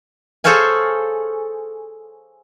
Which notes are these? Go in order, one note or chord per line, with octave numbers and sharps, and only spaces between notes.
G#4 A4 C5 C#5 F5 G#5